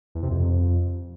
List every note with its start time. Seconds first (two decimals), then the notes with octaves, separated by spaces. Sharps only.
0.15 E2
0.23 C3
0.31 F2